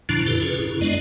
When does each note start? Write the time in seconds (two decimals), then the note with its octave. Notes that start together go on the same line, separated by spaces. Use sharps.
0.09 F#2 A#2 D3 F3 D4 E4
0.26 E4 F4 G4 A4 B4
0.41 C#3 C#4 G#4 B4
0.59 F#2 E4
0.81 G#3 B3 D4 D5 D#5